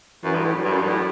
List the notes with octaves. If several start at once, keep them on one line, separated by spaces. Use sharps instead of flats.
F#2 E3
G2
A2
F#3
G2
F#2
G2
A2